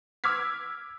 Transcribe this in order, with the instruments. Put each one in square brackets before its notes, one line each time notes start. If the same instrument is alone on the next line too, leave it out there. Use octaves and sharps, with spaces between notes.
[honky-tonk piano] D6 E6 F6 G#6 B6